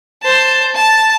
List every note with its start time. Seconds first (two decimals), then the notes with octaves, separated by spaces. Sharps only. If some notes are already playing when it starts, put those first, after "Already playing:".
0.22 C5 A5
0.74 A5